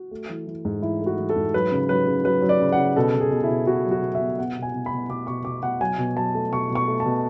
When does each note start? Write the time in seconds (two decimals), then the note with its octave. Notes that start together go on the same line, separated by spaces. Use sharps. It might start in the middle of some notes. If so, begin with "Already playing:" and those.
Already playing: F#4
0.11 A3
0.30 E3
0.47 E3
0.65 G#2
0.82 E3 E4
1.01 A3
1.06 F#4
1.18 E3
1.29 A4
1.36 G#2
1.54 F#3 B4
1.71 C#3
1.89 F#3 B4
2.07 C#3
2.24 F#3 B4
2.42 F#3
2.49 D5
2.60 C#3
2.72 F#5
2.78 C#3
2.96 B2 A4
3.14 B2
3.20 G#4
3.31 B2
3.44 E4
3.49 B2
3.67 B2 F#4
3.84 F#3
3.91 F#4
4.02 B2
4.15 E5
4.20 B3
4.39 B3 F#5
4.57 B2
4.63 G#5
4.74 B2
4.86 B5
4.92 B2
5.09 B2 D6
5.27 B2 C#6
5.45 B2 D6
5.63 B2 F#5
5.81 F#3 G#5
5.98 B2
6.16 F#3 A5
6.34 A3
6.52 B2 C#6
6.70 B2
6.75 C#6
6.88 A3
7.00 A5
7.05 B2